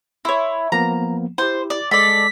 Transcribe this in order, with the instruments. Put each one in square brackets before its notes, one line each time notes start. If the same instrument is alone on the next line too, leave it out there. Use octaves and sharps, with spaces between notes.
[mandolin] E4 C#5 [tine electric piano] C6
[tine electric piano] F3 A#3 B3 [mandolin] A#5
[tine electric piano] E4 G4 [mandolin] C5
[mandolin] D5
[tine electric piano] G#3 [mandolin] A4 D5 [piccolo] B6